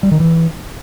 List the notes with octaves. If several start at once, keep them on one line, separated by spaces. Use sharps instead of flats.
G3
D#3
E3